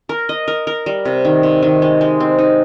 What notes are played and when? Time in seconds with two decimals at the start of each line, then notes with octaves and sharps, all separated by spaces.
0.09 A#4
0.29 D#5
0.48 A#4
0.67 A#4
0.86 G3
1.05 C3
1.25 D#3
1.43 C3
1.63 D#3
1.82 G#3
2.01 G#3
2.20 C4
2.39 D#4